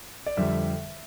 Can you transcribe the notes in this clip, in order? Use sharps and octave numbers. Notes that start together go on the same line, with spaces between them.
D5
F2 D3 G3 E5